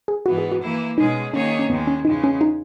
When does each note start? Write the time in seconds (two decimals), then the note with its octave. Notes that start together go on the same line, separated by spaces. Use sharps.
0.08 G#4
0.26 G#2 E3 B3 F#4
0.38 G#4
0.52 F#4
0.61 E3 A#3 E4
0.98 B2 G#3 C#4 D#4 G#4
1.33 D#3 A#3 C#4 D#4 G#4 C#5
1.59 C#4
1.69 D#2 D#3 G#3 B3
1.87 C#4
2.05 E2 C#3 G#3 D#4
2.24 C#4
2.41 D#4